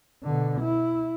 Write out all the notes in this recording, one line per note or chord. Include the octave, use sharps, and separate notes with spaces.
B2 D3
E4